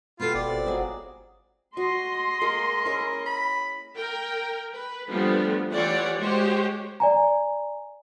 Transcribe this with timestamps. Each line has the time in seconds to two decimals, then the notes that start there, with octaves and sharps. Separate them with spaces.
0.20 B2 F4 G4 A4 B5
0.35 G1 F4 D5
0.48 C3
0.67 F#3 F#4 G#4 D#5 A#5
1.77 F#4 D#5 C6
2.41 G#3 A#3 A#4
2.86 C#4 E4 A#4
3.26 B5
3.94 A#4 G5
4.75 B4
5.09 F3 G3 A3 B3 D4
5.71 E3 F4 G4 C#5 D5 F#5
6.18 G#3 F#4 G4 C5 C#5
7.00 D5 G#5 A#5